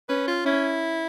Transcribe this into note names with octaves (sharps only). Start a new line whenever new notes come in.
C#4 B4
F4
C#4 E4